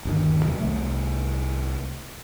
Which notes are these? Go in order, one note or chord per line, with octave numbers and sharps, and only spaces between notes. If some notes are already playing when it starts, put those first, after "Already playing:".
G1 D#2 D#3
F2 C3 D#3 F#3
C2 A3